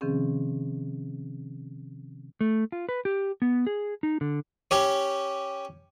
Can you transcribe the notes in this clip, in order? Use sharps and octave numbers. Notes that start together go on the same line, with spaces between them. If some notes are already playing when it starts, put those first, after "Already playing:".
C3 D#3 F3 C4 C#4 G#4
A3
F4
B4
G4
B3
G#4
D#4
D3
C#4 G4 C#5